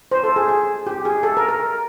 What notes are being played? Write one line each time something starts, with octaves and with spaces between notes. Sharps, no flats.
C5
A4
G#4
G#4
G4
G#4
A4
A#4
A#4